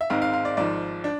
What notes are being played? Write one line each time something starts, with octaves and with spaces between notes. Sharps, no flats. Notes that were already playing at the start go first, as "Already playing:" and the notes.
E5
G#1 G#2 G#3 C4 F5
F5
F5
D5
G#1 G#2 F3 D5
D4